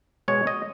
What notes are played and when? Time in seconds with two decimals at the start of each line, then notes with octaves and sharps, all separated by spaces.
0.28 B2 G#3 C#5
0.47 D#5